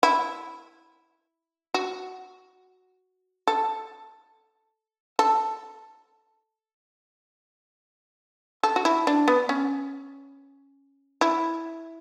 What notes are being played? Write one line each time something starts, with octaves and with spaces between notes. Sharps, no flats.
E4
F#4
A4
A4
A4
F#4
E4
D4
B3
C#4
E4